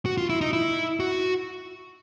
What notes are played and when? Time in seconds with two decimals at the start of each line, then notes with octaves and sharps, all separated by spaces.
0.06 F#4
0.18 F4
0.29 E4
0.41 D#4
0.53 E4
1.00 F#4